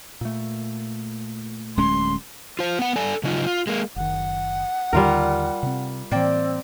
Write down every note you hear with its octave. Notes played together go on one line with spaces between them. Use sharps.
A#2 A3
D1 G#3 C#4 C6
F4 C5
B3 F#5
A4 D5 G#5
C#3 F#3 D#4 F4
F4
G#3 A#3
F#1 D#3 F#5
D#2 D3 D#3 G3 F4 A#4
C3 C4
A2 E3 A#3 C4 D5 G5